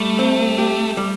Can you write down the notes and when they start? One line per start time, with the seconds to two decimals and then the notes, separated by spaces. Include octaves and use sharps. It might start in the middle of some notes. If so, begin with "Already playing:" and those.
Already playing: G3 A3
0.19 C4
0.58 G4
0.97 G3